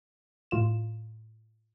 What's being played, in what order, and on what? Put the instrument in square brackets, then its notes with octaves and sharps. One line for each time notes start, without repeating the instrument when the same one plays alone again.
[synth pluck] A2 F4 E7